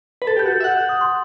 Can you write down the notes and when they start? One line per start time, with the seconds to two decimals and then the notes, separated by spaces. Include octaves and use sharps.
0.22 B4
0.27 A4 A6
0.36 G4
0.39 G6
0.46 F#4
0.52 G6
0.60 E5
0.64 F#5 F#6
0.77 F#6
0.89 D#6
1.01 C6